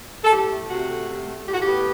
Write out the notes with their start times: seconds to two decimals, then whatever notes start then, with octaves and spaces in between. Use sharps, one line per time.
0.24 A4
0.32 A2 G4
0.51 A3
0.69 C3 F#4
0.89 A3
1.08 C3
1.27 A3
1.46 A2 G4
1.53 F#4
1.61 B3 G4